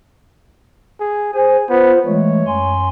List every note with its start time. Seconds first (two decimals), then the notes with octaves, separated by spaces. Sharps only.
1.00 G#4
1.34 G#4 C5 G#5
1.69 B3 F4 C5
2.06 E3 G#3 A3 C#5
2.47 F#2 G#5 C6